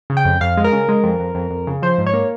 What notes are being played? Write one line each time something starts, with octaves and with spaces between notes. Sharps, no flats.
C#3
G5
F2
F2 F5
G#3
A#4
C#3
G#3
F2
F2
F2
F2
C#3
F3 C5
G#2
C#5
A#3